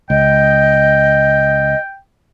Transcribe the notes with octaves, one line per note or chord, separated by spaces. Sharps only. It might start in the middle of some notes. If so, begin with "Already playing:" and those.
C#2 D#5 G5